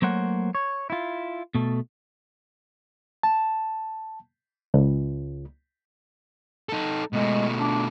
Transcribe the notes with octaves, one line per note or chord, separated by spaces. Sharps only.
F#3 A3 A#3 C5 C#5 F#5
C#5
E4 F4
B2 A3 A4
A5
C#2
D#4 A4
B2 G#3 A3
D4